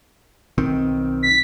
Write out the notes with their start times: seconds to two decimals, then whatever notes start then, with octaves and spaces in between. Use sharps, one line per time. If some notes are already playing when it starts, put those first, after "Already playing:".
0.58 B1 D#3 C4
1.23 B6